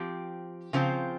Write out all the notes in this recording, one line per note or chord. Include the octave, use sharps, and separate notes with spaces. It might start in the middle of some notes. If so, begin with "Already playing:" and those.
Already playing: F3 C4 G4
C#3 F3 C4 F4